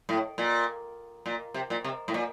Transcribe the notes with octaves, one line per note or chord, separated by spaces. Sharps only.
A2
A#2
A#2
C3
A#2
C3
A2
A#2